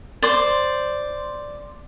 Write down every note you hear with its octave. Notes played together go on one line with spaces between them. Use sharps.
C5 D5